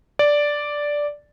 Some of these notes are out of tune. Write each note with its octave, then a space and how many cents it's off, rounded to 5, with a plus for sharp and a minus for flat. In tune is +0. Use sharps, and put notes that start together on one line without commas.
D5 -5